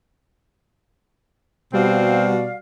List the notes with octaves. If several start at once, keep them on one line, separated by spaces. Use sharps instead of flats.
B2 G3 C4 F#4 D5 F5